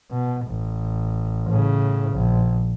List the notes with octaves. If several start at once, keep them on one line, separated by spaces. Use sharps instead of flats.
B2
A1
A2 C#3
A#1